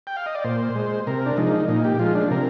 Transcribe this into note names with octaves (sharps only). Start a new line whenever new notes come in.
G5
F5
D#5
D5
A#2 C5
G#3
C3 A#4
D4
F3 G#3 D#4
A#2 D#4
G4
F3 G#3 F4
D4
C3 A#4